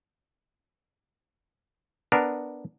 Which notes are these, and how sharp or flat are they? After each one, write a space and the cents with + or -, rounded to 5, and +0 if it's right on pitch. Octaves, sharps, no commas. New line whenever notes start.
B3 +0 D4 +0 A#4 +0